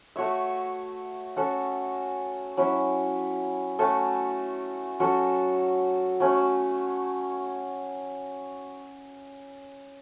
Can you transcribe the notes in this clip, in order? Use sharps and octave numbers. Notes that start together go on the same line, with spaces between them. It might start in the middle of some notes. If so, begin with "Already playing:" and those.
A3 F#4 C#5 E5
C#4 F#4 A4
F#3 C#4 E4
A3 C#4 F#4 A4
F#3 C#4 F#4 A4
F#3 A3 C#4